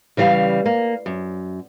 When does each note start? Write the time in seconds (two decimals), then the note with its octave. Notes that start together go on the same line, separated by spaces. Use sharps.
0.17 C#3 E3 G3 F5
0.66 A#3
1.06 F#2